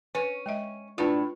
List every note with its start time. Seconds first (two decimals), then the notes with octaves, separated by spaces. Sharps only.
0.15 C#4 B4
0.46 G#3 D#5 E5
0.98 A2 D4 F4 B4 A5